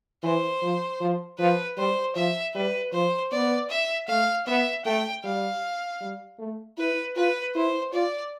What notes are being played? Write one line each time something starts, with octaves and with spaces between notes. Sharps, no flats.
E3 C5
F3
F3
F3 B4
G3 C5
F3 E5
G3 B4
F3 C5
B3 D5
E5
A3 F5
B3 E5
A3 G5
G3 F5
G3
A3
E4 B4
F4 B4
E4 C5
F4 D5